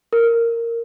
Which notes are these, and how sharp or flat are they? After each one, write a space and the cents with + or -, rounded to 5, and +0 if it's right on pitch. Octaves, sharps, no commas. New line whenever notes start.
A#4 -10